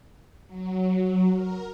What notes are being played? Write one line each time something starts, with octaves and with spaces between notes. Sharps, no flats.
F#3
A#4